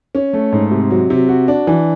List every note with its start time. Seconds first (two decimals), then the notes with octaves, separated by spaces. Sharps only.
0.15 C#4
0.33 A3
0.52 G#2
0.71 C3
0.91 F#3
1.10 C3
1.29 F#4
1.48 D4
1.67 E3